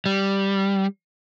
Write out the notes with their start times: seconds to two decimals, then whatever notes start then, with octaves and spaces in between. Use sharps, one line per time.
0.06 G3